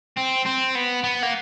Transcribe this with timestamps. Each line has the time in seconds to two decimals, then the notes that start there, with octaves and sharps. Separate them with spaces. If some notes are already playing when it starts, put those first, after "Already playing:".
0.17 C4
0.46 C4
0.75 B3
1.04 B3
1.23 A#3